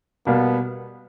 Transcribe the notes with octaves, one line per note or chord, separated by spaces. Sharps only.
B2 G3 A#3 B3